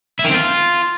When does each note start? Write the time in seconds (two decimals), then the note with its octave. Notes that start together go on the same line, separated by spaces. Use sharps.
0.19 E4
0.24 D#3
0.29 C4
0.34 F4